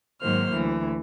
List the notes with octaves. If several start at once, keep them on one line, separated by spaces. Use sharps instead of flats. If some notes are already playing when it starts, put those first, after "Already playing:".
G#2 D#3 F#3 A#3 C5 F6
D2 E3